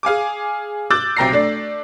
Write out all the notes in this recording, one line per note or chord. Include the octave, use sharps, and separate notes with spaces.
G#4 F5 G#5 D6
D6 E6 F#6 G6 A6
B1 C3 G5 A#5 A#6 C7
A3 D4 D5